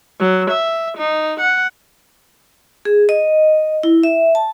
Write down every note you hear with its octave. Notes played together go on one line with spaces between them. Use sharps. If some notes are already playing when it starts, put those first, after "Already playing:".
F#3
E5
D#4
F#5
G#4
D#5
E4
E5
A5